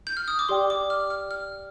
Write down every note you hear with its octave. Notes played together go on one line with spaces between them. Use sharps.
G6
F6
D#6
D6
G4 D5 G5 C6
D6
F6
F6
F6